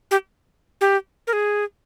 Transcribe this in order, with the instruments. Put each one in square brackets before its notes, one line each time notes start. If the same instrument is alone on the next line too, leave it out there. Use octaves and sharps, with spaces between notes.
[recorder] G4
G4
A#4
G#4